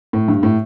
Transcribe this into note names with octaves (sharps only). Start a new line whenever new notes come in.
A2
G2
A2